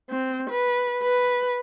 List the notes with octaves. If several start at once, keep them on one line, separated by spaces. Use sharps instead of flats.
C4
B4
B4